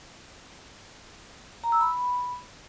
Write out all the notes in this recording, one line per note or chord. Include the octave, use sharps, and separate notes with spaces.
A#5
E6
B5